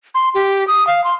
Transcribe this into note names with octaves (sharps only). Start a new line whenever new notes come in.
C6
G4
D#6
F5
C6